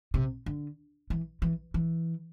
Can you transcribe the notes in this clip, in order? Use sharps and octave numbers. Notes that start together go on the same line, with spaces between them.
C3
D3
E3
E3
E3